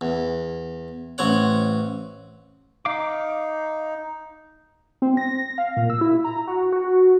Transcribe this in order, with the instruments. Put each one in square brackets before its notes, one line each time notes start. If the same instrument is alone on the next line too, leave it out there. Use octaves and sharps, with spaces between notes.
[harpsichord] E2
A1 C4 C#5 F#5
[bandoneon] D#4 [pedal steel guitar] F5 D6
[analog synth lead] C4
A#6
F5
A#2
E6
E4
A#5
F#4
F#4